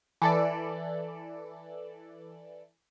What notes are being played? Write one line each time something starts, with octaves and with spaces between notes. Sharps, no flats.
E3 A4 D5